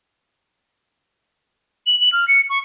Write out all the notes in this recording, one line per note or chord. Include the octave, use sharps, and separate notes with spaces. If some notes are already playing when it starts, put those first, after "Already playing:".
F#7
F#7
F6
C#7
C#6